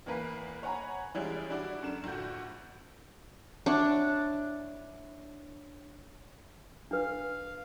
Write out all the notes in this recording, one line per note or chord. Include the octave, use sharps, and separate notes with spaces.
E2 E3 A#3 B4 B5 C7
C#5 F#5 G#5 A#5 B5
E3 F3 G3 G#3 C#4 E4
G3 D4 E4 F#4 D5
F#2 D3 D4 E7
A#1 A2 F#4 G6
D4 E4 C#5 F#5
D4 B4 F5